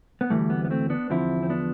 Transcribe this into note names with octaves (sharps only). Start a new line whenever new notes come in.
B3
D2 C3 E3 G3 A3
B3
B3
A3 C4
B3 D4
E2 D3 F3 C4 E4
C4
B3 D4